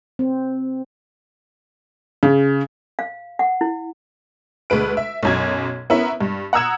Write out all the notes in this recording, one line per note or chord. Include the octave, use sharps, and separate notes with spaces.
C4
C#3
F5
F#5
E4
D2 G#3 B4 D7
E5
B1 F#2 G#6
B3 C#4 E4 A#4 E5
G2
F#5 A#5 D#6 E6 G#6 E7